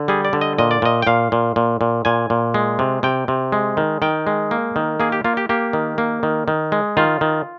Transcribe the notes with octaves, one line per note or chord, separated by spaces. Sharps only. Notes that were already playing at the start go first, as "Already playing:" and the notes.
Already playing: D3
G3 G#4
D5
D3
D#5
A#2 D#5
D5
A#2 D#5
G5
A#2 F5
A#2
A#2
A#2
A#2 G#5
A#2
G#3
C3
C3 G5
C3
G#3
D#3
D#3 G5
G#3
A#3
D#3
A#3 G#4
G4
A#3 F4
G4
A#3 G4
D#3
A#3
D#3
D#3
G#3
D#3 F4
D#3